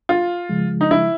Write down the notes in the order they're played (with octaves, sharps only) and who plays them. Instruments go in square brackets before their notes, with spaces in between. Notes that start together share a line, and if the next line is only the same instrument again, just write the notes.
[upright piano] F4
[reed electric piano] C#3 F3 G#3
[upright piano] D#4
E4